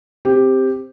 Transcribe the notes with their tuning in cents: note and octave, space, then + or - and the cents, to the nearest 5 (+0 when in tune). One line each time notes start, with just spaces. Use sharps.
C4 +0 G4 +5